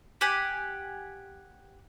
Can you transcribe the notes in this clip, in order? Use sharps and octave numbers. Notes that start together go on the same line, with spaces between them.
G4 F#5 G#5